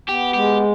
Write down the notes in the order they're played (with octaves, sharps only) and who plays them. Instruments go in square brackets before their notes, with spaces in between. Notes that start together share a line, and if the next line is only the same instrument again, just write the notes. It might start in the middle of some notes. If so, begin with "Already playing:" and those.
[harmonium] B3 [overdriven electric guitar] G4
[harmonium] G#3 [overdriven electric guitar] G4